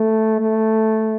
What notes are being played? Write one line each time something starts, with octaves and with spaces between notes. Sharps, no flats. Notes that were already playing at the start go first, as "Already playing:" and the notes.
Already playing: A3
A3